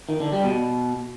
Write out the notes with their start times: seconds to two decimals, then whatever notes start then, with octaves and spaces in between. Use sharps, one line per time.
0.09 D#3
0.20 D3
0.32 G3
0.44 B2